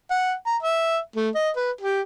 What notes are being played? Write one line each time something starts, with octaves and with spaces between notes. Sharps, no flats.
F#5
A#5
E5
A3
D#5
B4
G4